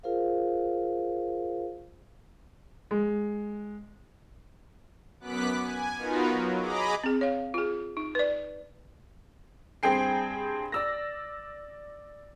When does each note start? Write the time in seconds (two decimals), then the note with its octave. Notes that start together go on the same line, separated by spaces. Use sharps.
0.03 F4 G#4 A#4 C5 F5
2.91 G#3
5.20 F#2 B3 D6 F#6 B6
5.62 G#5
5.97 B3 D#4 F4 F#4 A#4 B4
6.28 F#3
6.59 G#4 D#5 A#5 B5 D6
7.04 C4 G#4
7.21 C#5 F5
7.54 F4 G#4
7.97 D#4
8.15 B4 D5
9.83 G2 C4 G#4 G5 C7
10.72 D5 E6 A#6